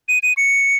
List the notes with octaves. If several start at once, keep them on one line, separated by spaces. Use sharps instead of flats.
D#7
D#7
C#7